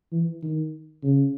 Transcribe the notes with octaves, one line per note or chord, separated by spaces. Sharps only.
E3
D#3
C#3